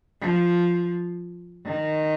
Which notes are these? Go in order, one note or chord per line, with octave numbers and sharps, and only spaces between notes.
F3
D#3